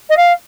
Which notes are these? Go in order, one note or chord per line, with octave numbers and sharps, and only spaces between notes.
D#5
F5